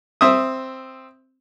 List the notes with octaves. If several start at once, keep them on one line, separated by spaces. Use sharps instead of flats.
C4 E5 D#6